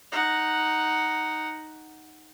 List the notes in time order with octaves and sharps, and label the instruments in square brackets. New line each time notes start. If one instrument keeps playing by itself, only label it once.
[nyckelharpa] D#4 F#5